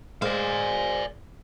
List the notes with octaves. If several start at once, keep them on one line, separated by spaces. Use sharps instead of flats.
G#3 G#4 C5 D5 F5